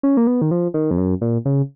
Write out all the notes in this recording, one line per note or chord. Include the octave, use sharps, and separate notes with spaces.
C#4
A#3
B3
D#3
F3
D#3
F2
F#2
A#2
C#3